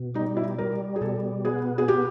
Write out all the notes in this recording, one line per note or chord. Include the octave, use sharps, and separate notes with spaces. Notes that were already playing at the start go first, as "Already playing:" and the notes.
Already playing: B2
G3 D#4
E4
G3 A#4
G#4
B2 A4
B3 G#4
G#4
B3 G4